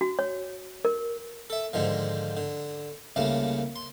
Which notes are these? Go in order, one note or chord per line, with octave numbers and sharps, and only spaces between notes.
F#4
C#5
A#4
A4 E5
G#2 D3 D#3 F3
D3
C2 C#3 A3 A#3
C6